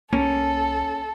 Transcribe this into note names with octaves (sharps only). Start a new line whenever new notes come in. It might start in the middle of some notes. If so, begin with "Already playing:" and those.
C2 A#3 C#4 A4